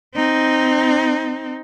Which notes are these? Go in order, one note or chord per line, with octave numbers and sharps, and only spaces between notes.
C4 D#4